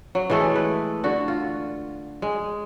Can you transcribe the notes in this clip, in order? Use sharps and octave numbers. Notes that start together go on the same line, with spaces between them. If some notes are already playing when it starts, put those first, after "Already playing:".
F#3
E3 G#3 A3 A4
B4
D3 F#4
F4
G#3